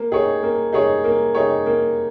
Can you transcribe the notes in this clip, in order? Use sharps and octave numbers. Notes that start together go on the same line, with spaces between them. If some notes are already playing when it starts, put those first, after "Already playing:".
Already playing: A#3
D#4 G#4 C#5
A#3
D#4 G#4 C#5
A#3
D#4 G#4 C#5
A#3